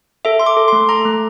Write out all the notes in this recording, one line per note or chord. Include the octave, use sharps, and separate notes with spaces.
A4 E5
A4 C6
D6
A4
A3 C6
A4 A#5
A3